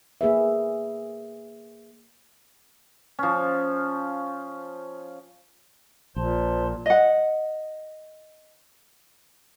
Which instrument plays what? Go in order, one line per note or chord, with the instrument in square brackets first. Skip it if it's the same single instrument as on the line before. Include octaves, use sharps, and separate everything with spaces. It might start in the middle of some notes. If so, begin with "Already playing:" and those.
[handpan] A#3 G#4 B4 E5
[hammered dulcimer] F3 C#4
[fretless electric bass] A#1 [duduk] A#2 [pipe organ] C5 A5 C6
[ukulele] D#5 F#5